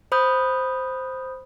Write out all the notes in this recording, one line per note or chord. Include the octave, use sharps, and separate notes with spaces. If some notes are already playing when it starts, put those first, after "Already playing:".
C5 B5 D#6 G6